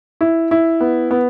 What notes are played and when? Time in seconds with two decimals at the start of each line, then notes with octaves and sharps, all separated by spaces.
0.21 E4
0.51 E4
0.81 B3
1.11 B3